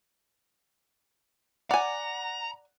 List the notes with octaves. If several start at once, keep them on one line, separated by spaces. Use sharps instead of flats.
D5 F#5 G#5 A#5